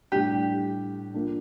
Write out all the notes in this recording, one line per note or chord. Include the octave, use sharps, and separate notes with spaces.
A2 G3 D4 G4
F3 A#3 D4